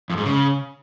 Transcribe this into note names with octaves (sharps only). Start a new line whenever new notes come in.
F2
G#2
C#3